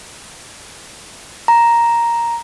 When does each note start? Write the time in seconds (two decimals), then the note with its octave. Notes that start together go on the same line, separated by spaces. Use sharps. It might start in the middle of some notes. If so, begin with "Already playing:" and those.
1.48 A#5